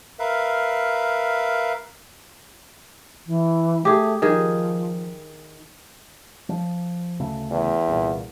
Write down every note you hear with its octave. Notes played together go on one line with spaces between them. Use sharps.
A#4 B4 E5 F5
E3
A3 G4 G#4
D#3 F3 G#4
F3
D2 C#3 A3
E2
C2 A#2